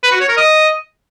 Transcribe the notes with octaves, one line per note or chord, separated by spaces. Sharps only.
B4
F#4
C#5
A#4
D#5